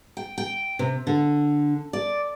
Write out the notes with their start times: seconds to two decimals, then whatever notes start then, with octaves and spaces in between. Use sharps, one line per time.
0.17 G5
0.38 G5
0.79 C3
1.07 D3
1.93 D5